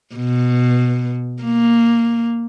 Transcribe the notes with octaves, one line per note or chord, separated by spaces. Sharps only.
B2
A#3